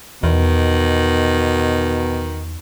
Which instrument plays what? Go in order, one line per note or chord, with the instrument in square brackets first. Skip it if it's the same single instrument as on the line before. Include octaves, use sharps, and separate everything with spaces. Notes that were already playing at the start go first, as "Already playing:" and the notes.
[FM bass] E2 [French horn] B2 [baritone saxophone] D#3